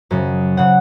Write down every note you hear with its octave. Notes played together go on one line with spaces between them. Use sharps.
F#2 C#3
C#3 F#5